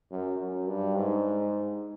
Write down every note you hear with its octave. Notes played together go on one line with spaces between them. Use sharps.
F#2
F#2
G2
G#2